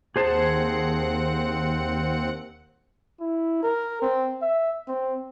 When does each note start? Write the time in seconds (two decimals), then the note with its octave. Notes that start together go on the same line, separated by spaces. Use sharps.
0.16 D#2 C4 G#4 C5 F#5 A5
3.20 E4
3.63 A#4
4.02 C4
4.42 E5
4.88 C4